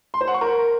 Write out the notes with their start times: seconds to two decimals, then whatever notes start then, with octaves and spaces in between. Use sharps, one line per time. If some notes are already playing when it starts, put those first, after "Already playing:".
0.14 C6
0.21 C5
0.27 F#5
0.34 C#6
0.41 A#4